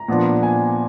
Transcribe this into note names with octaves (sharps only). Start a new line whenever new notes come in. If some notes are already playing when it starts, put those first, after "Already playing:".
Already playing: A#5
A#2 F3 B3 D4
G#5